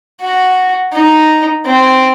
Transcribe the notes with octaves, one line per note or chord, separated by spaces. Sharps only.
F#4
D#4
C4